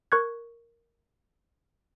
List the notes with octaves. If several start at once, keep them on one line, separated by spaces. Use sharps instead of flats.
A#4 C#6 F#6 G#6